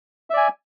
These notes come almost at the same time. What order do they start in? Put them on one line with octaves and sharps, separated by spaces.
E5 D5 G#5